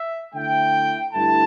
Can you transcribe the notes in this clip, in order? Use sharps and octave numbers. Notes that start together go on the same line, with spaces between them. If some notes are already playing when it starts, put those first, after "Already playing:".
Already playing: E5
D3 A3 E4 G5
G2 D3 A3 E4 A5